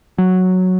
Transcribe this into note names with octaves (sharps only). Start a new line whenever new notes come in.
F#3